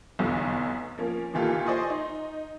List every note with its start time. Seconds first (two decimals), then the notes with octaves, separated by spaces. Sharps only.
0.19 F1 B1 E2 B2 D3 E3
0.98 F3 A#3 C#4
1.34 A#2 D#3 E3 F4 G4 A4
1.66 C5 D5 D#5 G#5 C6 C#6
1.90 D#4